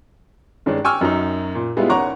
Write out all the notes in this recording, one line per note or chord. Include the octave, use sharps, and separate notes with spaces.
G2 D#3 G#3 C#4 D4
G5 G#5 C#6 D6 E6 F6
F#2 F#3 D#4
A#2
G3 G#3 B3 E4 F4
G#1 C#4 F#5 A#5 C#6 D6